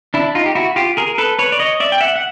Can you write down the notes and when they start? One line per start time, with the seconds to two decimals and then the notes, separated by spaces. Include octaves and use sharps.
0.14 D4 E4
0.35 D#4 F4
0.46 G4
0.55 E4 F#4
0.76 F4 G4
0.97 G#4 A#4
1.18 A4 B4
1.39 B4 C#5
1.52 D5
1.59 C#5 D#5
1.80 D5 E5
1.92 G5
2.00 E5 F#5
2.15 F#5